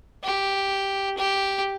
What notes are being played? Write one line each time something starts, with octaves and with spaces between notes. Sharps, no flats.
G4
G4